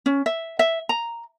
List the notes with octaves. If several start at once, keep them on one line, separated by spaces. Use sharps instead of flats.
C#4
E5
E5
A#5